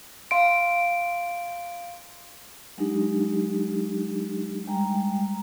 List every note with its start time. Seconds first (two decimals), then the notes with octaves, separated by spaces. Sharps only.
0.31 F5 C6 D7
2.78 F#3 G#3 D4 D#4 G4
4.67 G3 G#3 G5 A#5